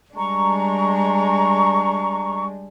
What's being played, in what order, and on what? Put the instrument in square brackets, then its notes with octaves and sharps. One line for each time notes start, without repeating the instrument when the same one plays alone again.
[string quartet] G3 G#3 D4 [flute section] A#5 C#6